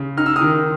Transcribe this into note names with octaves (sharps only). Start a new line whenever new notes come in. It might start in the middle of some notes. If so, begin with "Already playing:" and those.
Already playing: C#3
D#4 F6
E6
D#6 F6
D#3